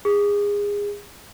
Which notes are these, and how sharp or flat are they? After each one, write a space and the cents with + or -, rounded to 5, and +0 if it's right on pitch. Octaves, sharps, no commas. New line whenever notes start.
G#4 -25